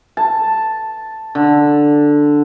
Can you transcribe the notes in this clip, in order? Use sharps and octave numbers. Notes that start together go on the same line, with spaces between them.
A5
D3